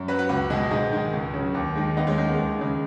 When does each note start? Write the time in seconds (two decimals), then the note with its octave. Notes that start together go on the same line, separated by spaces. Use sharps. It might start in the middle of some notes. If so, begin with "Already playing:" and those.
Already playing: F#2
0.08 F#3 F#4 B4
0.19 F#4 B4
0.29 C#2 F#4 B4
0.50 B2 D#4 G#4
0.53 G#3
0.71 G#2 D#4 G#4
0.92 D#3 G#3
1.13 C#2
1.34 C#3 F#3
1.54 D#2
1.76 D#3 G#3
1.97 D#2 B3 D#4
2.07 G#3 C#4
2.18 D#3 G#3
2.28 B3
2.39 D#2 G#3
2.59 C#3 G#3